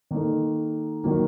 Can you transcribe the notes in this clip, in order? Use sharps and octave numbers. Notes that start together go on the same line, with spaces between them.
D#3 A#3 D#4 A4
D#3 F#3 A#3